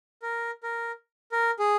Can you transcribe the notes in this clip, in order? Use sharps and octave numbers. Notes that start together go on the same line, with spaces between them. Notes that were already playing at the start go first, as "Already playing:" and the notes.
A#4
A#4
A#4
G#4